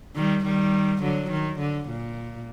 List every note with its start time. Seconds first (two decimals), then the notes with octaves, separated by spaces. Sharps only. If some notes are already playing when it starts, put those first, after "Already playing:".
0.15 D#3 G3
0.45 D#3 G3
1.02 D3 F#3
1.31 D#3
1.59 D3
1.89 A#2